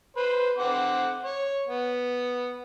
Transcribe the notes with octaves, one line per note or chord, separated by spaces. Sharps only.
B4 C5
C4 F#5 D6
C#5
B3